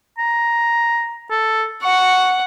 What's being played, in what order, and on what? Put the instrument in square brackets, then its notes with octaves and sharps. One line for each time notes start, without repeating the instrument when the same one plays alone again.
[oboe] A#5
A4
[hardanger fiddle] F#5 [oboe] C#6